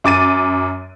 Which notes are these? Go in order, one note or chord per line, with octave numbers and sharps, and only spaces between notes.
F#2 D6 A6 D#7